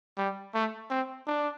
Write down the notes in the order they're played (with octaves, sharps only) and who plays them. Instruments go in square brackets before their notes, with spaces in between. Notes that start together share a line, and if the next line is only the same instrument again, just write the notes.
[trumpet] G3
A3
C4
D4